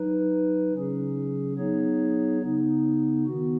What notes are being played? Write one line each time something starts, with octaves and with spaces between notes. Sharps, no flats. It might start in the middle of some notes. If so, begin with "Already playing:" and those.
Already playing: F#3 D#4 B4
C#3 F#3 C#4 G#4
F#3 B3 D#4 G#4 C#5
C#3 B3 D#4
D#3 B3 F#4